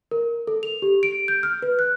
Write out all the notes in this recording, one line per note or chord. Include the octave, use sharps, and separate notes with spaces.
A#4
A4
F7
G4
D7
G6
F6
B4
F#6